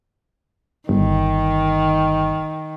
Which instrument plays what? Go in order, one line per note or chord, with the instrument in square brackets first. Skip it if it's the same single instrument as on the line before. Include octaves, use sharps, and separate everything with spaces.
[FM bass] G1 [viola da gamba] D#3